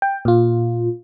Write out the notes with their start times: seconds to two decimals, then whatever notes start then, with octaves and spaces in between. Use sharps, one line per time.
0.02 G5
0.25 A#2 F4